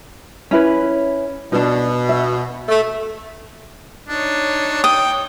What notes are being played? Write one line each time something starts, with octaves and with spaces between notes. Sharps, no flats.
C#4 E4 B4
B2 D4 D#4
E5
A3
D4 D#4 C#5
G5 D#6